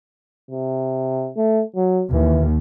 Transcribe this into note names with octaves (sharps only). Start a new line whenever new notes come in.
C3
A3
F#3
D#2 E3